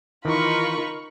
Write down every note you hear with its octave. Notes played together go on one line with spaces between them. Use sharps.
D#3 E3 D#4 F4 A#4 B5 C#6